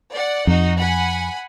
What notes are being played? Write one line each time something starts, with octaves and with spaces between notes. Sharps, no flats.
D5 F#5
F2 D#4 F#4
F#5 G#5 B5